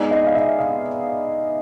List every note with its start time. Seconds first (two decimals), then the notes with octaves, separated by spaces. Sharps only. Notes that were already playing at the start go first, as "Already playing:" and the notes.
Already playing: G#3 B3 D#4 G#4 D5
0.11 D#5
0.26 F5
0.35 E5
0.58 F5